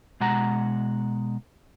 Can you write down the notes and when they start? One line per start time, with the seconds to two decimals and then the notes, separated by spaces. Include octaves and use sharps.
0.20 B2 G#3 F#5 A#5